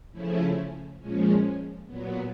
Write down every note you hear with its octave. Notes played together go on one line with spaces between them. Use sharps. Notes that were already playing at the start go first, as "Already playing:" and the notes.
C#3 F3 A3 C#4 E4
A#2 F3 G#3 C#4
A#2 F#3 B3